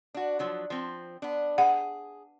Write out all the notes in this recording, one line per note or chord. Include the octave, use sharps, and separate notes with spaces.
D4 F#4
F3 F#3 D4
F3 C4
B3 D4
G#4 F#5